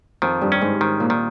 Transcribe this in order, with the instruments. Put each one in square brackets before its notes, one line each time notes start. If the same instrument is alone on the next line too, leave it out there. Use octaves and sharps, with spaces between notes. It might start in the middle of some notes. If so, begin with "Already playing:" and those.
[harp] F2 [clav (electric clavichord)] D#3
[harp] G2
[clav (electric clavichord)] C#4
[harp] G#2
[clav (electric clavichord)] D#3
[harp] A#2
[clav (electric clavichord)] D#3